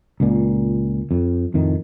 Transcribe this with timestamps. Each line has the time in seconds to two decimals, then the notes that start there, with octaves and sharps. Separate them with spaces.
0.20 C#2 A#2
1.11 F2
1.54 F2 A2 D#3